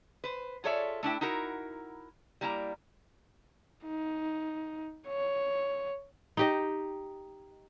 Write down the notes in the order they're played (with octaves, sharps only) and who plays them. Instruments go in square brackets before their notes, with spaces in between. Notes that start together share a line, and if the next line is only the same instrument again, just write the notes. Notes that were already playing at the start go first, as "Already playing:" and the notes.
[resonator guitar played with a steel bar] B4 C5
F4 G#4 A4 C#5 D5 E5
A3 D4 E4 G5
D#4 E4 F#4 A#4
G3 A#3 E4 G5 A#5
[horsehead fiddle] D#4
C#5
[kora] D#4 G4 D#5